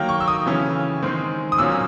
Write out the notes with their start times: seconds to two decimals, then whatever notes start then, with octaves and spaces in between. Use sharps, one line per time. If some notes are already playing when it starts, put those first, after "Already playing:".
Already playing: D#3 F#3 A#3 G5
0.09 C#6
0.20 E6
0.28 D#6
0.46 C#3 E3 A3 C#4
1.02 D#3 G#3 C4
1.52 D#6
1.58 A#2 F#3 A#3 C#4 E6